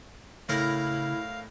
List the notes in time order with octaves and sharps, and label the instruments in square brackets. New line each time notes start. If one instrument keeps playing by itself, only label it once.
[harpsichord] A2 A#4 A#5 [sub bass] C#3 [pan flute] E4 [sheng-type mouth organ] F5